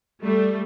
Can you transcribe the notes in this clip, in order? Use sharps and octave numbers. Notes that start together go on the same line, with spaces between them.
G3 A3